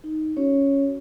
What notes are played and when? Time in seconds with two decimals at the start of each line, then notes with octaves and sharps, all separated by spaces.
0.04 D#4
0.37 C#4 F#4 C#5